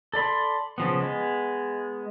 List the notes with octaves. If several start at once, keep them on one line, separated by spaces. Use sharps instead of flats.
A4 D5 B5 C6
C#3 F3 B3
G#3 B3